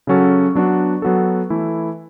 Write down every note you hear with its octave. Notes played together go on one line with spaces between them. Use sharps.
C#3 F#3 C#4 F#4 A4
F#3 B3 D4 F#4
F#3 B3 F#4 A4
E3 A3 E4